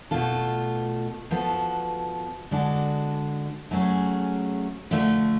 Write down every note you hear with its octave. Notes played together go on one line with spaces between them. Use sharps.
B2 A3 F4 A4
F3 B3 F#4 A4
D3 G#3 D4 F#4 A4
F#3 A3 C#4 G#4
D3 F3 A3